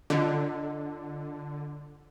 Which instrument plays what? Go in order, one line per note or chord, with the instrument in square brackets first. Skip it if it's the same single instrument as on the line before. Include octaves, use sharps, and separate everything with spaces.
[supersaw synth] D3 [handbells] F4 D#5